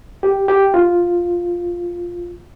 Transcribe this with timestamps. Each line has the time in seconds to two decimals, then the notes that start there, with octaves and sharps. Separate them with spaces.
0.23 G4
0.48 G4
0.74 F4